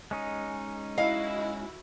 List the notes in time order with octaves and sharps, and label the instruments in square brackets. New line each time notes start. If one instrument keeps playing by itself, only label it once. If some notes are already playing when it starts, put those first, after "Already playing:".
[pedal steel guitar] G#3 C#4 D#4
[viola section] E4 F#4 [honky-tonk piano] D#5 [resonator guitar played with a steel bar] F5